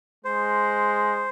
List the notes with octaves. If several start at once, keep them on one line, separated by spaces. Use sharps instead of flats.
G#3 C5